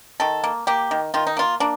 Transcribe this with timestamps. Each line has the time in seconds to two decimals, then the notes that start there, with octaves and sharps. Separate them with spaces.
0.20 D#3 A4
0.44 A#3
0.67 A#3 G4
0.91 D#3
1.14 D#3 F4
1.27 D#4
1.37 A#3 F4
1.60 A#3 D4